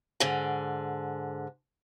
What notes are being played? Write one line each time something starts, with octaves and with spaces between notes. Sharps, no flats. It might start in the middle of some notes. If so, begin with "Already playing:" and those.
G#2 D3